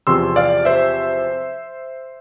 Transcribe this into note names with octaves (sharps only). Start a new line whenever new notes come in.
E2 C3 F3 C6 E6
D5 F5
C5 E5